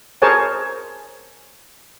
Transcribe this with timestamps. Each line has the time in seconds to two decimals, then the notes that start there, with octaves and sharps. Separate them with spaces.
0.22 G#4 A#4 C5 C#5 G#5 A5